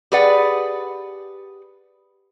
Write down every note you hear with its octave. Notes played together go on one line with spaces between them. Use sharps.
G4 G#4 B4 D5 F#5